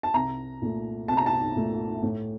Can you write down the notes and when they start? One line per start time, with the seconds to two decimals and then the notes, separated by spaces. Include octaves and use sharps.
0.03 A5
0.14 C2 A#5
0.62 A#2 A3
1.08 C2 A5
1.17 A#5
1.26 A5
1.56 A#2 A3
2.02 A2